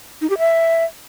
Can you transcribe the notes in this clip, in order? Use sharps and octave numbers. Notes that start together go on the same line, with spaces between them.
D#4
G4
E5